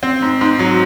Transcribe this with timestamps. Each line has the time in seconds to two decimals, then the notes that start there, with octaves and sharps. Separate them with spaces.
0.03 C4
0.22 G#2
0.41 G#2
0.59 F#3